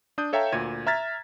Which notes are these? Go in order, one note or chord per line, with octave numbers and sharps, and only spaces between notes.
D4 D#6 G6
A4 C#5 E5 F5 G5 A#5
D2 A#2 G#6 D#7
E5 A#5 F6 G#6 A6 B6